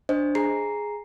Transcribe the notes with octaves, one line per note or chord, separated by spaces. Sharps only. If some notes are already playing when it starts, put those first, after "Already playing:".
D4 C5 D#5
G#4 A#5 C7